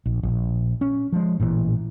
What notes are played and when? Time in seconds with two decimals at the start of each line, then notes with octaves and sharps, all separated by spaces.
0.06 A#1
0.23 A#1
0.81 C#4
1.12 F3 G#3
1.40 A1 A#2 D3 E3